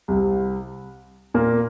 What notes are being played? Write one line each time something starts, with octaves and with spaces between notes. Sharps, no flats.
C2 C3
A#2 A#3